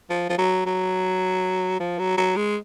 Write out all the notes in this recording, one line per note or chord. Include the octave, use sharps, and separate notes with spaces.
F3
F3
F#3
F#3
F3
F#3
F#3
G#3